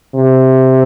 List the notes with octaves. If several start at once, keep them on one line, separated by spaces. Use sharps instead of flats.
C3